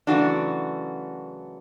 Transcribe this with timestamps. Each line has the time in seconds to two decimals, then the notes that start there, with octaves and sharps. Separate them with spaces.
0.07 F#2 C#3 E3 A3 D4 F#4